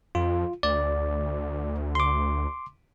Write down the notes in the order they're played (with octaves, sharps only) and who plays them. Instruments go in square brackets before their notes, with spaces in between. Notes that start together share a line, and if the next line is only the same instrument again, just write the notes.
[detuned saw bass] F2 [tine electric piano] F4
[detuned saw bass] D2 [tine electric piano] D5
[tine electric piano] C6 D6